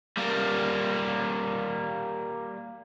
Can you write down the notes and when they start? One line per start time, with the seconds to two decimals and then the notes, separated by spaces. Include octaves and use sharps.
0.18 G3 A#3